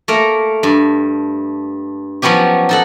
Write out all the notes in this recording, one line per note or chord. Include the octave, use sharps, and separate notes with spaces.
A3 A#3 A#4
G2
F3 F#3 B3 C#4 G4
D#4 A4 F#5